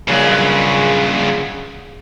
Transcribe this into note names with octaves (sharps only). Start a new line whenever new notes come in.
G2 A#2 C#3 F#3 G#3